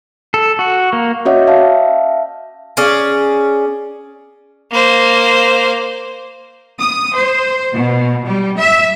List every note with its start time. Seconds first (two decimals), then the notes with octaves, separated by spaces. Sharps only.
0.34 A4
0.59 F#4
0.93 A#3
1.25 C#4 F#4 C#5 D#5 E5 F#5
1.47 E5 F5 A5
2.77 C#4 G#4 D5
4.72 A#3 C5
6.78 D#6
7.15 C5
7.74 B2
8.25 G3
8.59 E5